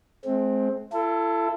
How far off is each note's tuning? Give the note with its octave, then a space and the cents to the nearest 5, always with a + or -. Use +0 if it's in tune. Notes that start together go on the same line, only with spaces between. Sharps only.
G#3 +40 C4 +10
E4 +45 A4 +10